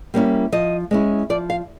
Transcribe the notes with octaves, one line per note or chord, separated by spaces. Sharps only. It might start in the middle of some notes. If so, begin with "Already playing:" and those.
G3 A#3 C#4 E4
F3 D#5
G#3 C#4 E4
F3 D5
F5